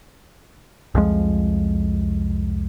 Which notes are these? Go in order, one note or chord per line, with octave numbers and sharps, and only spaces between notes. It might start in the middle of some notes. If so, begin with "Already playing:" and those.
C2 F2 F3 G#3